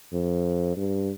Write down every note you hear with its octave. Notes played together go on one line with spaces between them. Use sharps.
F2
G2